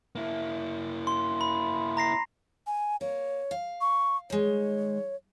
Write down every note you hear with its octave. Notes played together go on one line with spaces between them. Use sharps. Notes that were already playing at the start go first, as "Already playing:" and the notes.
A#3 E4
C6
B5
A#5 A#6 C7
G#5
A#3 C#5
F5
C#6
D#3 G#3 C#5